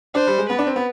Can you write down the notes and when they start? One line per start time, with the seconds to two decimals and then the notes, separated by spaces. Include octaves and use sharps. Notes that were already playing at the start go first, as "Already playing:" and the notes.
0.14 D4 C5
0.27 G3
0.38 G#3
0.49 B3 B4
0.59 D4
0.67 C4
0.76 B3